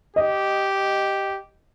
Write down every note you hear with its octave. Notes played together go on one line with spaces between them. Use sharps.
G4 D#5